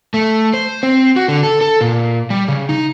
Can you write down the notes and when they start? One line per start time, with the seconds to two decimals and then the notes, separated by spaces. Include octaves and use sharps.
0.14 A3
0.54 C5
0.83 C4
1.16 F#4
1.28 D3
1.43 A4
1.61 A4
1.81 A#2
2.30 G3
2.48 C#3
2.69 D#4